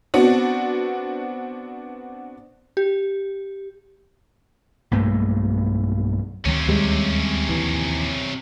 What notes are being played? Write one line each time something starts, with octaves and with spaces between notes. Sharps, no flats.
B3 C4 D4 F#4
G4
B1 G2 A3 A#3
D2 C3 D#3 F#3 C#4
D#2 G3 G#3
A#1 D#2 E3